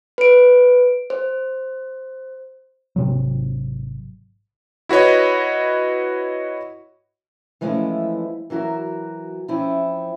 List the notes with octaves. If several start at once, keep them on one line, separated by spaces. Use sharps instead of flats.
B4 D7
C5
G#1 C3 F#3
E4 F#4 B4 C#5 D#5
E3 F3 G#3 A3 C#4 E4
E3 F#3 F#4 A#4
F3 C4 C#4 E4